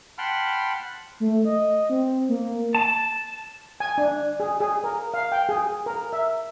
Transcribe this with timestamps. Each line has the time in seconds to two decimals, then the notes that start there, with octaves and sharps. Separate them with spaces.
0.18 F#5 G5 A5 B5 C6 F6
1.20 A3
1.45 D#5
1.90 C4
2.29 A#3
2.75 A5
3.80 G#5
3.98 D4
4.40 G#4
4.60 G#4
4.84 A#4
5.14 F5
5.32 G5
5.49 G#4
5.86 A#4
6.13 E5